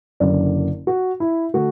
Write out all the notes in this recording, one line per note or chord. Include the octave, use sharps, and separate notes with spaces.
F#1 F#2 D3 D5
F#4
E4
D3 A3 F#4